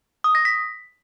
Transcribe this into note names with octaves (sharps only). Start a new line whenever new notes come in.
D#6
A#6
B6